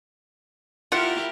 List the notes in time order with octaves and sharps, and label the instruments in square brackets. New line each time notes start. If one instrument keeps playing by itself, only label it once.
[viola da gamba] E4 G4 A#4 [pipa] F4 F#5